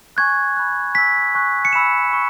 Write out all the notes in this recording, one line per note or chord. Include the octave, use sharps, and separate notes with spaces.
G#5 C#6 F#6 G#6
B5 F#6
G#5 E6 B6
G#5 C#6 F#6
C#7
G#5 B5 E6 E7
C#6 E6